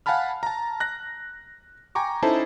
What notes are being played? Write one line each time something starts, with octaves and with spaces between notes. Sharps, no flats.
F5 F#5 G#5 A5 B5 F6
A5 A#5
F#6 A#6
G5 G#5 A#5 C#6 D6
C#4 D#4 E4 A4 C5 A5